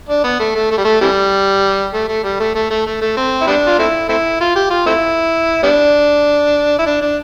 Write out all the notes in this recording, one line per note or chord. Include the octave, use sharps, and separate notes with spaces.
D4
B3
A3
A3
A3
G3
A3
C3 E3 G3
A3
A3
G3
A3
A3
A3
A3
A3
C4
E4
G3 B3 D4
F4
A3 C4 E4
A3 C4 E4
F4
G4
F4
A3 C4 E4
G3 B3 D4
E4
D4
D4